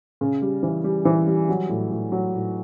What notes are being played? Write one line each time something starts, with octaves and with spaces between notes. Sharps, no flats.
C#3
G3
E3
G3
E3
G3
F#3
A2
A2
F#3
A2